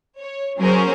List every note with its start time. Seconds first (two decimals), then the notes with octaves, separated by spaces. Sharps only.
0.18 C#5
0.58 F#3 C#4 G#4 A#4 C5